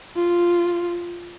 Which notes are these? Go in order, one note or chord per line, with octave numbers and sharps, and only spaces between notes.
F4